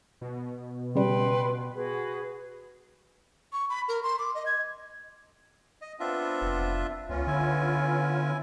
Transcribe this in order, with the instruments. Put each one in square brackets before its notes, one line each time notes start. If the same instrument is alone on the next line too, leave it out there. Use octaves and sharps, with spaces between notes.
[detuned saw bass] B2
[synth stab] C#3 G3 [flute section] B4 G5 C6
[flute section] F#4 G#4 B4
[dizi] C#6
B5
A#4
C6
D6
D#5
G#6
[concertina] D#5
[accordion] B3 C4 [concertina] D4 F4 E5
[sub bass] F1
[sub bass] C#2 [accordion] B3 C#4 F4
[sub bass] D3 [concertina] E4 G#5